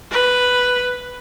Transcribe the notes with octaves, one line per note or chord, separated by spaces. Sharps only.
B4